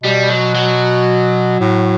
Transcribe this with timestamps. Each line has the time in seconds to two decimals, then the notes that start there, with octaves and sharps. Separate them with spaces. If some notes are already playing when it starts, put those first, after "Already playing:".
0.04 B2 G3
0.29 F#3
0.55 F#3
1.60 A2